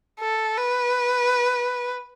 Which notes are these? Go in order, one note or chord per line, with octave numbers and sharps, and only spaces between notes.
A4
B4